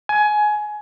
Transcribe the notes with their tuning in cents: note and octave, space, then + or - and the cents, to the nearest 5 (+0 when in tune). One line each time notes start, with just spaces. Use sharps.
G#5 +20